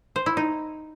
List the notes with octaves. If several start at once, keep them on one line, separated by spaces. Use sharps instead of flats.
C5
E4
D#4